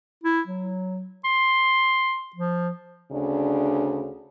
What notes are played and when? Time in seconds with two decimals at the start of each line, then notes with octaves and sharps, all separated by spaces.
0.24 E4
0.47 F#3
1.25 C6
2.36 F3
3.11 D2 C#3 D4